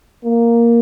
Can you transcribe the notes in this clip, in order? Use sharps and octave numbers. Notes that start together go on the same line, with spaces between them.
A#3